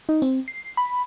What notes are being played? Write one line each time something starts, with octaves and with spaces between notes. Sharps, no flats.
D#4
C4
C7
B5